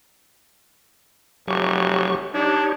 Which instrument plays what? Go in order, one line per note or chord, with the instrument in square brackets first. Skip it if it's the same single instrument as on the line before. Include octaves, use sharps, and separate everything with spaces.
[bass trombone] F1 [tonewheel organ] F#3 G4 C#6
[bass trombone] D4 [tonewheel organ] D#4 G4 C#5